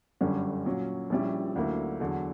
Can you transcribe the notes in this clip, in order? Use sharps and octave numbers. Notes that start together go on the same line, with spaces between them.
G1 F#2 D3 G3 C#4
A#2 F#3 C#4
A#1 A#2 G3 C#4 E4
D2 D3 F#3 A#3 E4
E2 D3 F#3